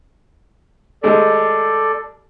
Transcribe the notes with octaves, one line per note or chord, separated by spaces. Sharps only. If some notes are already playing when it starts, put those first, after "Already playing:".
D#2 G#3 A3 A4 D5